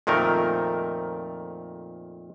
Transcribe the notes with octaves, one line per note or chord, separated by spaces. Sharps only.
F2 A#2 D#3 A3 A#4